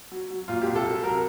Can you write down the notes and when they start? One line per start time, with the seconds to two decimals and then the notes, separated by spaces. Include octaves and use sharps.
0.12 F#3
0.30 F#3
0.48 A#2 F4
0.62 C2 G4
0.76 A4
0.85 F#3
1.03 C2 A#4